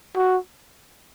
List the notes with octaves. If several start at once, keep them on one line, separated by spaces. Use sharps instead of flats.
F#4